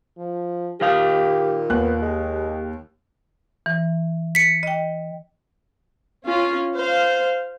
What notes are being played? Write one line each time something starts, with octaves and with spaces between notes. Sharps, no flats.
F3
A#2 D#3 G4 F5
D#2 B3 F#6
G#3 G4
E3
B6 C#7
D#5 G5
C#4 F4
C5 F5